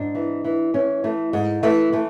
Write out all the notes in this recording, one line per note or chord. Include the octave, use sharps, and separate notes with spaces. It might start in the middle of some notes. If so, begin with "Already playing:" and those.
Already playing: G#2 D4
E3
E3
E3 C#4
E3 A3
G#2 G#3
E3 A3
E3 A3